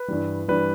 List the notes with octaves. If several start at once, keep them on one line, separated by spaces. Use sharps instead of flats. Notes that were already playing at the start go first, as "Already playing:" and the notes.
Already playing: B4
G2 E3 G3
G2 E3 G3 B4